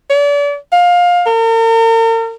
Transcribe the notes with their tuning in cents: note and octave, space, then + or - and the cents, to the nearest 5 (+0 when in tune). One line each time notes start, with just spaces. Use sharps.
D5 -35
F5 +20
A#4 -45